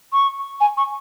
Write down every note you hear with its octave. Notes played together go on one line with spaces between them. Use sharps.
C#6
G#5
C#6